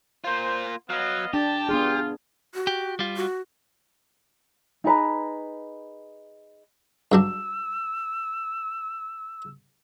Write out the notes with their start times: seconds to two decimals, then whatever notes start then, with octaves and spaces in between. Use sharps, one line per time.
0.24 A#3 F4 C5
0.90 F#3 B3 D#5 F5
1.34 D4 G4 A5
1.69 B3 D4 F4 G#4
2.54 F#4
2.67 G4
2.99 G3 F4
3.17 F#4
4.84 D#4 G#4 B4 A#5
7.12 G2 F#3 D4 E6